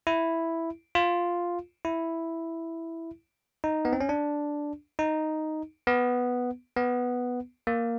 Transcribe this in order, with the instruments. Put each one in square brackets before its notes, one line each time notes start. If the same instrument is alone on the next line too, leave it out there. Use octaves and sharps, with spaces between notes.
[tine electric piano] E4
F4
E4
D#4
B3
C4
C#4
D4
D#4
B3
B3
A#3